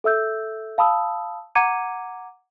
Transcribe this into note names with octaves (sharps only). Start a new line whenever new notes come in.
A4 E5 E6 G6
F5 A5 B5 D#6 E6
F#5 A#5 D6 G#6 C#7 D#7